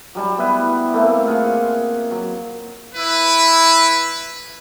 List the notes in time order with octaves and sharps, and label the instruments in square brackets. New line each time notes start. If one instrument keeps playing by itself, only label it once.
[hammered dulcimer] F#3 G3 A5
B3 E4 B4
A3 A#3 C4
F4 G#4 F#5
F#3
[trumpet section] E4 [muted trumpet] B4